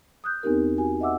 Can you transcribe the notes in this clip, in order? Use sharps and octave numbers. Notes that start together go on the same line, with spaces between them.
D#6 F#6 G6
E2 B3 C4 D#4 G4 A#4
F#4 G#5
D#5 E5 F#5 D6 E6